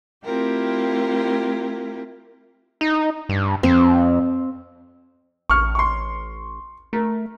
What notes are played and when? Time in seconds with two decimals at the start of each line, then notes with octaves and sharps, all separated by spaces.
0.25 A3 C4 E4 F4 G4 A#4
2.81 D#4
3.29 G2
3.63 F2 C4
5.50 A1 C#6 F6
5.75 C6 C#6
6.93 A3 A#4